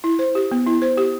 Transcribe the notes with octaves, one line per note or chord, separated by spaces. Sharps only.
E4
C5
G4
B3
E4
C5
G4